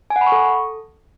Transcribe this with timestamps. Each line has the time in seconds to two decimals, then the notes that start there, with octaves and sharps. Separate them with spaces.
0.10 G#5
0.16 F#5
0.21 B5
0.27 C#6
0.32 A4